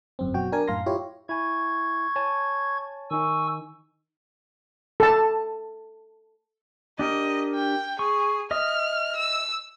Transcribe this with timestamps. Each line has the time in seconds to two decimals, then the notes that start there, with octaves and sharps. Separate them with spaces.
0.19 G1 F#2 C4
0.34 B2 F#3 F#4 G5
0.52 D4 A#4 G#5
0.68 F#2 A2 F5 A#5 C6 A#6
0.86 E4 F4 G4 C#5
1.29 E4 G#5 C#6 G#6
2.16 C#5 G#5 A5
3.11 D#3 D#4 G#5 C#6 E6
5.00 A4 A5
6.99 D4 G4 A#4 D#5
7.54 G5
7.99 G#4 C#6
8.51 D#5 E5 D#6 F6
9.16 E6